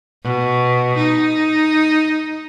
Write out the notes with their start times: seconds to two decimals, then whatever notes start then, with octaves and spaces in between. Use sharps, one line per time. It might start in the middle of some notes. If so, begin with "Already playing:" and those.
0.24 B2
0.97 D#4